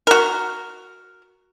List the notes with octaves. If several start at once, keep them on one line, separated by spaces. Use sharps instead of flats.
F#4 A#4